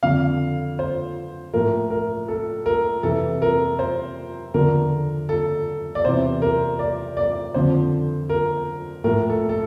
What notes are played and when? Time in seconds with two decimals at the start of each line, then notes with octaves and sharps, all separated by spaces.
0.03 F2 D3 F3 F5
0.79 C5
1.53 A2 F3 A#4
1.90 A#4
2.28 A4
2.66 A#4
3.03 F2 C3 E3 A4
3.42 A#4
3.79 C5
4.54 E2 D3 F3 A#4
5.29 A4
5.95 D5
6.04 E2 C3 E3 C5
6.42 A#4
6.79 D5
7.17 D5
7.54 F2 D3 F3 C5
8.30 A#4
9.04 A2 F3 A#4
9.30 A4
9.49 A4